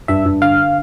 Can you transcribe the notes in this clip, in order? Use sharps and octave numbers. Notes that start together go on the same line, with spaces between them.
G2 E5
G2
D3 F5